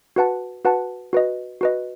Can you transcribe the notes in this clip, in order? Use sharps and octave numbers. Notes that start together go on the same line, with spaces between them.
F#4 B4 F#5 A5
F#4 B4 F#5 A5
F#4 B4 D#5
F#4 B4 D#5